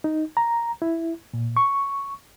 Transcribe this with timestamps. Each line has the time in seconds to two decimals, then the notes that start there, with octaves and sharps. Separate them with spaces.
0.04 D#4
0.37 A#5
0.82 E4
1.34 A#2
1.57 C#6